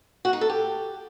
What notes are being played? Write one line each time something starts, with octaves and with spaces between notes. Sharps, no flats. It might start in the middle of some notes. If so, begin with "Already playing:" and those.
F#4
D#4
A4
G4